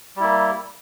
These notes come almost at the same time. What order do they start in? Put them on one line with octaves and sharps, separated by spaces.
G3 E4 A#3